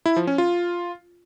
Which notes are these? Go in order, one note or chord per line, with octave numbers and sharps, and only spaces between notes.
E4
F3
C#4
F4